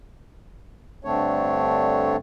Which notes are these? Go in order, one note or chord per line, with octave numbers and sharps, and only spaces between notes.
G2 D3 A3 C4 D4 C#5